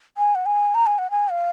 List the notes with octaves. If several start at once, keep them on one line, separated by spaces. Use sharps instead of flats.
G#5
F#5
G#5
A#5
G#5
F#5
G#5
F5